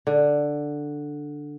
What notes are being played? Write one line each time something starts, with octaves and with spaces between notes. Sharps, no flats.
D3